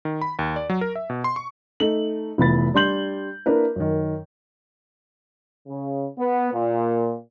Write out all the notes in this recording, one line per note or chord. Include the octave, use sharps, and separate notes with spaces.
D#3
B5
D#2
D5
F#3
A#4
E5
B2
C6
C#6
A3 D#4 F#7
F1 E3 B3 B5 A6
G3 D4 C6 G6 F#7
A#3 D4 E4 A#4 B4
F#2 D#3
C#3
B3
A#2